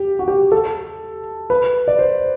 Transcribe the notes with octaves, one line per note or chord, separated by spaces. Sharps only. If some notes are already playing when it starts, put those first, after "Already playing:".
Already playing: G4
F#4
G4
A4
B4
D5
C5